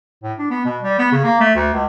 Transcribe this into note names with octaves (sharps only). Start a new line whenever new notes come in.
A2
D4
B3
B2
G3
B3
C#3
A#3
A3
D2
C#2